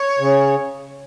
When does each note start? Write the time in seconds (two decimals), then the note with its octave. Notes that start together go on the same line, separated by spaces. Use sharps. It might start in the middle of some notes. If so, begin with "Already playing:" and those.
Already playing: C#5
0.19 C#3